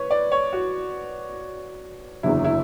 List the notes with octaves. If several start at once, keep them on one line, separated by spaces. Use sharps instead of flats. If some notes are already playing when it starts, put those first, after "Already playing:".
Already playing: B4 C#5
D5
C#5
F#4
F#1 E2 D3 F#3 E4
E4